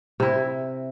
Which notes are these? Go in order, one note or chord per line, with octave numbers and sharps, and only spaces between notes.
C3 E4